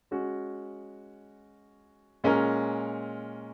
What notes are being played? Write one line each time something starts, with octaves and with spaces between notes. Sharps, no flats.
G#3 C#4 F#4
A#2 G#3 C#4 A#4